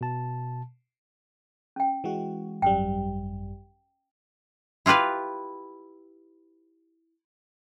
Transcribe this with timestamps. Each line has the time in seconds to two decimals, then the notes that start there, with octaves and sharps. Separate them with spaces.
0.01 B2 A5
1.76 C#4 G5
2.04 E3 G#3 F#4
2.62 G#1 F#2 G3 G5
4.86 E4 F4 G4 B4 F5